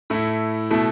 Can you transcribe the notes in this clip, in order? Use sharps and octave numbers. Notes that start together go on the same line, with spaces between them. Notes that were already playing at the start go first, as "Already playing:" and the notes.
A2 A3 E4
B2 A3 E4